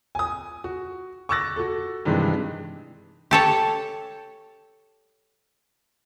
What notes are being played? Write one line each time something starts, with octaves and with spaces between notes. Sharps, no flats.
G#5 D#6
F#4
C#6 D6 E6 F#6 A6 A#6
F#4 A4
G2 C3 D#3 E3 G#3
G4 A4 C#5